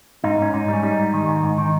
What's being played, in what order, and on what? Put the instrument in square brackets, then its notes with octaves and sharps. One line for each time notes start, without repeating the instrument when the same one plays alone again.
[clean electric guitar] G#2 D#4
G#2 C#4
G#2 D#4
G3 C#4
G3 D#4
G#2
D#3
G#2
G#2
D#3